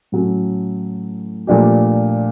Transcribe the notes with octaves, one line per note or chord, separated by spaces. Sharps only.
A2 F#3 A3 C#4
A#2 F3 A3 D4 G4